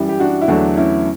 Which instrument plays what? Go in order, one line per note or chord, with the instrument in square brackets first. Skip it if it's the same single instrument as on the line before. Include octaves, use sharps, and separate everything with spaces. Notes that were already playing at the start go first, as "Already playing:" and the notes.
Already playing: [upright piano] F#2 E3 G3
G4
D4 F#4
E4
E2 D3 F#3 A3 D4 F#4
C#4 E4